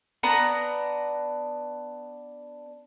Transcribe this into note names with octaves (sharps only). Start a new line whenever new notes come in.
B3 D4 B4 A#5